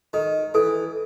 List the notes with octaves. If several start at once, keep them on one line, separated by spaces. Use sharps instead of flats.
D#3 A4
E3 A4